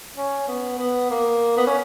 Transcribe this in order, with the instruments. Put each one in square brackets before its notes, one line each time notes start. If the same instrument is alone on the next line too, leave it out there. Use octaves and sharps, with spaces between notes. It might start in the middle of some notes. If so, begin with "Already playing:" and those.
[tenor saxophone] C#4
B3
B3
A#3
B3
C#4